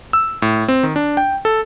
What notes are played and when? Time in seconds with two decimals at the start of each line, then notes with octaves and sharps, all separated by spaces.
0.13 E6
0.42 A2
0.68 C4
0.83 D#3
0.96 D4
1.17 G5
1.45 A4